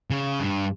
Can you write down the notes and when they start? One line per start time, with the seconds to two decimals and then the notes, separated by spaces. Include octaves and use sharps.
0.10 C#3
0.40 G2